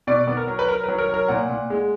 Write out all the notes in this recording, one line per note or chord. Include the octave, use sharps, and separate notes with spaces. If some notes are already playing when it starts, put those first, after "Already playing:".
B2 D5
B3
A#4
F#3
B4
F#3 A#4
F#3 B4
A#4
F#3 A#4
A#2 F#5
A#2
G#3